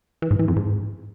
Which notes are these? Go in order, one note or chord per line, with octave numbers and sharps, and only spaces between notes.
E3
G#2
E3
F2
G#2